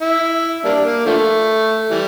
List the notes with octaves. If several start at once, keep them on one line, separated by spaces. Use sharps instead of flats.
E4
G3 A#3 D4
A#3
D3 F3 A3
E3 G3